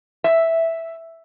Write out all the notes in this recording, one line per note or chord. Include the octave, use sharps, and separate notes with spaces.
E5